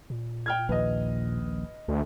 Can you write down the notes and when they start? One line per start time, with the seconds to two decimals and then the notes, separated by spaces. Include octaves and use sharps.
0.10 A#2
0.46 G5 F6 G#6
0.69 A#1 D#2 B4 D#5
1.88 D2